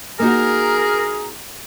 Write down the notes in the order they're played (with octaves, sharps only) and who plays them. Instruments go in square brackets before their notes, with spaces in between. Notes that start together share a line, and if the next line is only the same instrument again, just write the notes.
[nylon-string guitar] A#3 D#4 F#4 [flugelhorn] G#4 [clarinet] A#4 [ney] A#5